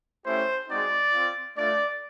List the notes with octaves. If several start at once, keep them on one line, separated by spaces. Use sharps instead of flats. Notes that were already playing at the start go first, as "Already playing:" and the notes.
A3 C#4 E4 G4 C5
G#3 C4 D#4 F#4 D5
C4 F4
A3 D4 F4 D5